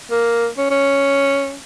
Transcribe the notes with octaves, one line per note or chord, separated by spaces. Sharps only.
A#3
C#4
C#4